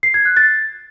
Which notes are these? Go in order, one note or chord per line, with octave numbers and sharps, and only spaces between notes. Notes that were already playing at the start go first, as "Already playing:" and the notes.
C7
G#6
F#6
A6